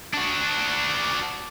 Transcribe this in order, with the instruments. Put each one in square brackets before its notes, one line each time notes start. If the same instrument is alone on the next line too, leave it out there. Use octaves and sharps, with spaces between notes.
[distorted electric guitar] D4 F#4